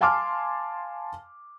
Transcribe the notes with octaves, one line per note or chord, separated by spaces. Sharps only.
F5 G#5 A5 C6 D6 F6